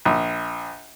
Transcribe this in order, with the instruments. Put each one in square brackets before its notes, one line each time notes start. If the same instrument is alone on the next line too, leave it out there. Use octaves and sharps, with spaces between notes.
[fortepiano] A#1